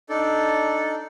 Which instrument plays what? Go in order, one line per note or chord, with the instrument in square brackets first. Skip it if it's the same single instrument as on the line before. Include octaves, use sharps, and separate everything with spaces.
[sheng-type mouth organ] D4 D#4 A4 D5